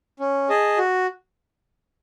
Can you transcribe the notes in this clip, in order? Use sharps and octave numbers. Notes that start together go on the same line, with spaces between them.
C#4
G#4 D#5 A5
F#4